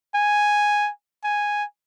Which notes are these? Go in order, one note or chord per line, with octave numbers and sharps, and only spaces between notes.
G#5
G#5